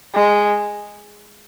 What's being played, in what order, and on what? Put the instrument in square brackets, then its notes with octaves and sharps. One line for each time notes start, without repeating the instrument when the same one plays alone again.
[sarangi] G#3